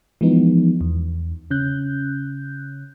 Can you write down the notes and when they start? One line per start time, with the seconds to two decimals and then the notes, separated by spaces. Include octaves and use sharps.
0.21 E3 F3 G#3 B3 D#4
0.81 E2
1.51 C#3 C#4 F#6 G6